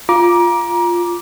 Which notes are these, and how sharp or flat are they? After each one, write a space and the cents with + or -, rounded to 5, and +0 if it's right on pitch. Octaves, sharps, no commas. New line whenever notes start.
F4 +0 A#5 +30 D6 +0